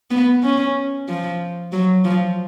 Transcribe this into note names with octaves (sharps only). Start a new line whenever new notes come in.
B3
C#4
F3
F#3
F3